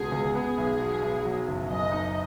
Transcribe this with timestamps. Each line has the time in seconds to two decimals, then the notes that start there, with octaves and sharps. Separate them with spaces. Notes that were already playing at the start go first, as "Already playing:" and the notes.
Already playing: C#2 B2 G#3 G#4
0.12 C#2
0.35 B3 G#4
0.58 B1
0.80 B2
1.02 B1
1.25 F#3
1.48 F#1
1.70 F#2 D#5
1.92 D#4